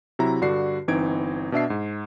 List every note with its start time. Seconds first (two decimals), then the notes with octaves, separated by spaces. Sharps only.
0.19 C3 F#3 E4 A#5
0.41 G2 D3 F#4 D5 C7
0.88 G1 E3 C4 D#4 G#6 D7
1.52 B2 D4 E5 C7
1.70 G#2